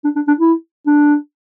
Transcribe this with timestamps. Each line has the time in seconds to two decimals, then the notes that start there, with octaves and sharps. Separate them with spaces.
0.04 D4
0.16 D4
0.27 D4
0.39 E4
0.86 D4